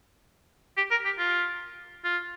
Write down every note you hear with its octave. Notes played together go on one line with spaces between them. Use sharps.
G4
A#4
G4
F4
F4